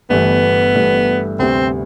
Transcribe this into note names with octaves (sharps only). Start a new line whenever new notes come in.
G1 G2 E3 A3 B3
G1 G2 E3 A3
D2 C3 G3 B3 C4